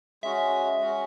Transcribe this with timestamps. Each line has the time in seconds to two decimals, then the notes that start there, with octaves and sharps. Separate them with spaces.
0.23 G#3 C#4 F#4 E5
0.81 G#3 C#4 F#4